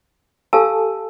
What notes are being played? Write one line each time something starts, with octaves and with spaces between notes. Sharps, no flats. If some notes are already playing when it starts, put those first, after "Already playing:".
G4 A4 F5 G#5 A5 E6